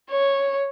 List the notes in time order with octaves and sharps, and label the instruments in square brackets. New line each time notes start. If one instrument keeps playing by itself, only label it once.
[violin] C#5